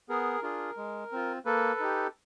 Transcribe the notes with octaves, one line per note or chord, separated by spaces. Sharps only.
B3 G#4 A#4
D4 F4 G#4
G#3
C4 F4
A#3 A4 B4
D#4 G4